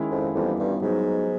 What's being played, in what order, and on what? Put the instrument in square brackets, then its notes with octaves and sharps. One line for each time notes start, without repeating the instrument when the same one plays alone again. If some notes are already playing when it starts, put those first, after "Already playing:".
Already playing: [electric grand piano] D#3 G#3 C#4 E4
[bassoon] F2
[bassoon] F2 [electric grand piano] E3 G3 B3 D#4
[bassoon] G2
[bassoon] G#2 [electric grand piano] F#3 B3 D#4